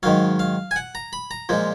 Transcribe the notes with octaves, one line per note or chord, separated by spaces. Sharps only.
G#2 D#3 F#3 F5
F5
G#5
F#5
A#5
B5
A#5
A#2 F3 G#3